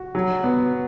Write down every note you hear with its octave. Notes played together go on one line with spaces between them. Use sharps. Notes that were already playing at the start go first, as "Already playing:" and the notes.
Already playing: F#4
F#3
B3